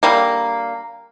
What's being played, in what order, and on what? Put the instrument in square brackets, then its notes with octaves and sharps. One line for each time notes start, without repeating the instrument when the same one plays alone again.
[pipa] D3 G3 A#3